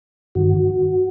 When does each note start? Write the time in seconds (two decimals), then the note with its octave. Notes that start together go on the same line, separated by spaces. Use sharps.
0.35 G2 D#3 F#4